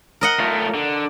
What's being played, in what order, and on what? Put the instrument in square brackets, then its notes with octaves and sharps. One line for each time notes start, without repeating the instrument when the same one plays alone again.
[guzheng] A#4 D#5 F#5
[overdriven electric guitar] A3 F4
D3